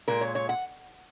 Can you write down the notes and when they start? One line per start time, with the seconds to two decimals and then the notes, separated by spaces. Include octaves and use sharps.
0.08 A#2 G#3 A#4
0.21 C#5
0.35 C#5
0.49 F#5